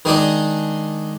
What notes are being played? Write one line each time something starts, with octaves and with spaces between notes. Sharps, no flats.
D#3 G#3 D4 D#4